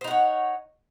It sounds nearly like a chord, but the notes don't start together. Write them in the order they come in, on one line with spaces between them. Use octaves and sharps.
C5 D#4 F#5 C#5